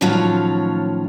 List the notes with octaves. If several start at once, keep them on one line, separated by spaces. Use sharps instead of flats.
A2 D#3 F3 F#3 C#4 F4